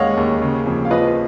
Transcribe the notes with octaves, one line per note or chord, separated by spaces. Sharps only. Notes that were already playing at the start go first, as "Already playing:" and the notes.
Already playing: D#2 D#3 G#3 C#5 D#5 F5 F#5
D#2
C#3
F2
F5
F3 B4 D#5